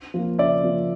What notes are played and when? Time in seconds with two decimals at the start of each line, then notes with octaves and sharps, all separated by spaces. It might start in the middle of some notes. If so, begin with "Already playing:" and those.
0.14 F3 A#3
0.39 C#3 D5 E5
0.64 F3 A#3